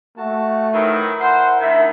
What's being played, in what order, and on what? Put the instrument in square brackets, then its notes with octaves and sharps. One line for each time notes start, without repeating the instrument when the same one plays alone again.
[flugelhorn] A3 [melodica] F#4 A5
[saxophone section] D#3 E3 F#3 [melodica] E4 A#4
[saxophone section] C5 [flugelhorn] F#5
[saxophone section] D2 D#3 [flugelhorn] E5